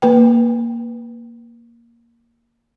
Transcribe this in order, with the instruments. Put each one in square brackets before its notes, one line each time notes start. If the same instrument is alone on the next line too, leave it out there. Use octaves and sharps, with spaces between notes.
[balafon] A#3 B4 G5